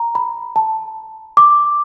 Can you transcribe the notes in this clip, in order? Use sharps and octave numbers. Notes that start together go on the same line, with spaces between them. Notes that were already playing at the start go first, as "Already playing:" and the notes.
Already playing: A#5
B5
A5
D6